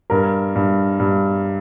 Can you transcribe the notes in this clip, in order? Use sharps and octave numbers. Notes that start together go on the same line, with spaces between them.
G2 A#4
G2
G2